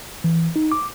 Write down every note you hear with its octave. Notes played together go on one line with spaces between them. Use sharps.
E3
D#4
D6